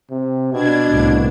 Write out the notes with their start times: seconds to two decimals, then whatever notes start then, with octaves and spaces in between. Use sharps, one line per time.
0.11 C3
0.53 B2 D4 G#6
0.88 C2 A2